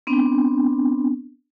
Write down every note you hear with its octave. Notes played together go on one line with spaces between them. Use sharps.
B3 C4 D4